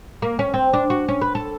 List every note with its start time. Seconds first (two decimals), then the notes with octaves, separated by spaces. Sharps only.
0.22 A#3
0.39 C#4
0.54 C4
0.73 D4
0.90 F#4
1.08 C#4
1.21 B4
1.35 A4